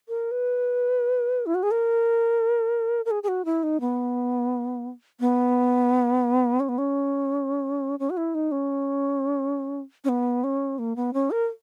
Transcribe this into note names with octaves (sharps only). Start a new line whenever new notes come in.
A#4
B4
E4
F#4
G#4
A#4
A#4
G#4
G#4
F#4
E4
D#4
B3
B3
C#4
B3
C#4
C#4
F#4
E4
D#4
C#4
C#4
B3
C#4
A#3
B3
C#4
A#4